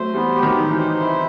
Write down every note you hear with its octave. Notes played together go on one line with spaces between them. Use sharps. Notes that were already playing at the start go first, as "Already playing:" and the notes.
Already playing: F#3 A3 C5
E3 G3 B3
G4
D#3 F#3
D#4
E3
C5
E4